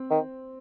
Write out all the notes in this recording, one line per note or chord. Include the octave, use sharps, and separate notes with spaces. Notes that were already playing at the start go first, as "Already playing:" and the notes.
Already playing: C4
D#3